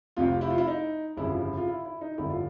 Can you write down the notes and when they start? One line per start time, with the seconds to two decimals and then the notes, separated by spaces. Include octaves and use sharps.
0.17 F1 F2 C3 F4
0.41 E4
0.50 F4
0.58 E4
0.67 D#4
1.17 G1 F2 C#3 E4
1.29 F4
1.41 E4
1.57 F4
1.68 E4
1.85 E4
2.01 D#4
2.18 G1 F2 D3 E4
2.30 F4